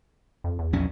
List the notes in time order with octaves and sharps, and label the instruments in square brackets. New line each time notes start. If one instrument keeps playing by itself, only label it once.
[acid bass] F2
E2
[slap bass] A#1 F#3 C#4